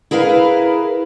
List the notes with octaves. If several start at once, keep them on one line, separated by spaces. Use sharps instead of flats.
E4 G#4 A#4 B4 F5